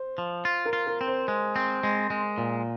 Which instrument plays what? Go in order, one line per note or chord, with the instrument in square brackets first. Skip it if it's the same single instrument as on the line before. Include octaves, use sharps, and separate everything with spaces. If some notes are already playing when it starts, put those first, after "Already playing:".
Already playing: [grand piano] C5
[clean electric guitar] F3
F4
[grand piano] A#4
[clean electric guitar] F4
[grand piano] A#4
[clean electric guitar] C4
[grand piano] C5
[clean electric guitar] G#3
C4
G#3
G#3
A#2